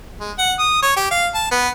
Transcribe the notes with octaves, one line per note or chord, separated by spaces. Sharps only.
G#3
F#5
D#6
C#5
G4
F5
A5
B3